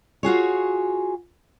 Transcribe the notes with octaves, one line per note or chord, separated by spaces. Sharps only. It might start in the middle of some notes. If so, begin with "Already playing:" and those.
F4 F#4 G#4 C#5